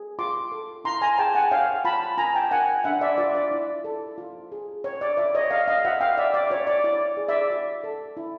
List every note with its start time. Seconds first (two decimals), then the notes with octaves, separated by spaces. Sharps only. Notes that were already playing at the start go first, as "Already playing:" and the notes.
Already playing: G#4
0.19 F4 C6 D6
0.52 A4
0.84 E4 A#5 C6
1.02 G#5 A#5
1.18 G#4 G5 A5
1.35 F#5 G#5
1.51 C#5 F5 G5
1.85 F4 A5 B5
2.18 F4 G#5 A#5
2.34 G5 A5
2.51 A#4 F#5 G#5
2.84 D4 E5 F#5
3.01 D5 E5
3.18 F4 D5
3.35 D5
3.51 E4
3.84 A4
4.18 F4
4.52 G#4
4.84 C#5
5.01 D5
5.17 F4 D5 E5
5.35 C#5 D#5
5.51 C#5 D#5 F5
5.68 D#5 F5
5.85 F#4 E5 F#5
6.00 F5 G5
6.17 C#5 D5 E5
6.34 D5
6.50 F#4 C#5
6.67 D5
6.84 E4 D5
7.17 G#4
7.29 D5 E5
7.50 F#4
7.84 A4
8.17 E4